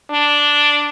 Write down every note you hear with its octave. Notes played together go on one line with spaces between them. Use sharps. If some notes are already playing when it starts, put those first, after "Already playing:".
D4